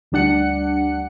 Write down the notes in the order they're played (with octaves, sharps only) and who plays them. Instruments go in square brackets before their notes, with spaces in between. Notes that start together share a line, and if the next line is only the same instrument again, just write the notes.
[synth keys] D2 G3 D4 F#5 C#7